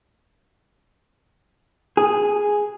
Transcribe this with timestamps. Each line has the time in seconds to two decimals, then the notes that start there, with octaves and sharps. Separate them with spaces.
1.97 G#4